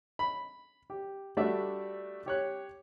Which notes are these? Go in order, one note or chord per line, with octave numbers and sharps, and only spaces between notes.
B5
G4
G3 A3 D4 F#4 D5 E5
G4 C#5 F#6